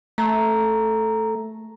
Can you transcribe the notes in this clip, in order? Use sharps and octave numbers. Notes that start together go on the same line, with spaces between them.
A3 A#5